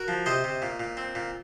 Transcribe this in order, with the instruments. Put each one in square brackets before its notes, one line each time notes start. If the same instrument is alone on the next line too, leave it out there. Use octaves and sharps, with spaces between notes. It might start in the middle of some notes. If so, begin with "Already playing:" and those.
Already playing: [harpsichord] F#4 A#4
F3
C3 C5 D#5
C3
A#2
A#2
C4
A#2